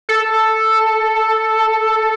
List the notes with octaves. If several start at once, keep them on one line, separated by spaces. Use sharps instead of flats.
A4